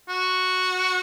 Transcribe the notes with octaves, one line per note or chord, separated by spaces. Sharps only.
F#4